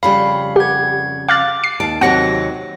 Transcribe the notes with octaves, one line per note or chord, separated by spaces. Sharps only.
F2 C#3 G3 F5 B5
G4 F#5 G#6
F5 D6 F#6 A6
C7
D#2 A5 D7
D#2 C3 F#3 C4 F#5 A#6 C#7